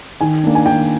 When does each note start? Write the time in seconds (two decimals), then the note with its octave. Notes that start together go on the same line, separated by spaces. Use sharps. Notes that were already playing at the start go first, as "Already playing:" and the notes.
0.21 D#3 G#5
0.44 A#3 D4
0.55 G#5
0.66 D#3 G5